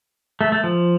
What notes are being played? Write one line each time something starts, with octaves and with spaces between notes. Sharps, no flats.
A3
A3
F3